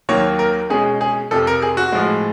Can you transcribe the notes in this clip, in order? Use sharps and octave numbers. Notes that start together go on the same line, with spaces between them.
D#2 D#3 F#3 A#3 C#5
A#4
B2 G#3 C#4 G#4
G#4
F2 C3 F3 A4
A#4
G#4
F#4
A2 F3 G#3